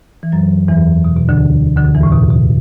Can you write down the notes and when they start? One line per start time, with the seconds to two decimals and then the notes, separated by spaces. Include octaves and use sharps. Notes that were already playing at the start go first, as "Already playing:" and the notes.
0.23 E3
0.32 F#2 F#3
0.68 E2 E3
1.05 B2
1.17 B2
1.29 D2 D3
1.77 D2 D3
1.95 E2 E3
2.03 A2
2.12 B2
2.31 B2